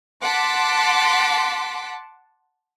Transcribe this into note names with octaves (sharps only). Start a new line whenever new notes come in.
F#5 A5 C6 D6 B6